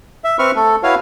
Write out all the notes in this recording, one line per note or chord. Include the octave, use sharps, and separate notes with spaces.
E5
C4 B4 E5 B5 C#6 F6
A3 A4
E4 F#4 B4 C#5 F5